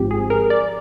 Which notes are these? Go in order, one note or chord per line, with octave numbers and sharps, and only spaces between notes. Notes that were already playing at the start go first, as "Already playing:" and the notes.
Already playing: G#1 G#2 F3 C4 G4
G#4
A#4
D5